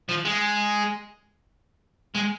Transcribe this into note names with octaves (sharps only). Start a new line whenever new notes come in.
F3
G#3
G#3